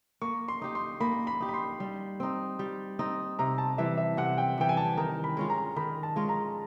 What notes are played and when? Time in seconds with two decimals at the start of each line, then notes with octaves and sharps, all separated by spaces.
0.22 A#3 C#6
0.48 C6
0.62 D#4 G4
0.75 C6
1.00 A#3 B5
1.27 B5
1.41 D#4 G4
1.49 B5
1.54 C6
1.80 G3
2.20 C4 D#4
2.59 G3
2.99 C4 D#4
3.39 C3 A#5
3.58 A5
3.78 E3 G3 E5
3.97 E5
4.17 C3 F#5
4.38 G5
4.58 E3 G3 G5
4.69 G#5
4.77 A5
4.97 D#3 A#5
5.24 B5
5.37 G#3 C#4 F4
5.50 A#5
5.76 D#3 B5
6.03 A5
6.16 G#3 C#4 F4
6.29 A#5